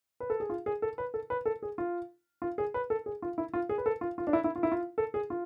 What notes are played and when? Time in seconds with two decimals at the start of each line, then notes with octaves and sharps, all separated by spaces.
0.20 B4
0.30 A4
0.40 G#4
0.50 F4
0.66 G#4
0.82 A4
0.98 B4
1.14 A4
1.30 B4
1.46 A4
1.63 G#4
1.78 F4
2.42 F4
2.58 G#4
2.74 B4
2.90 A4
3.06 G#4
3.22 F4
3.38 E4
3.54 F4
3.69 G#4
3.78 B4
3.86 A4
4.01 F4
4.18 F4
4.27 D4
4.33 E4
4.44 E4
4.56 F4
4.63 E4
4.72 F4
4.98 A4
5.14 G#4
5.30 F4